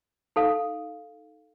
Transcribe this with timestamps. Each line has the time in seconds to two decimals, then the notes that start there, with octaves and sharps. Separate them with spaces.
0.36 D#4 A4 F5